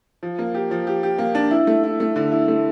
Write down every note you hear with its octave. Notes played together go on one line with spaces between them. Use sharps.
F3
A#3
G4
F3
G4
G4
A#3
D4
E4
A3
E4
A3
D3
E4
A3